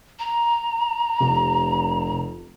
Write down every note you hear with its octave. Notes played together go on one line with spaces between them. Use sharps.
A#5
F1 C3